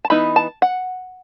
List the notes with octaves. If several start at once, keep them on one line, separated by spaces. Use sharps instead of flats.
A5
E3 B3 D#4 B5
A5
F#5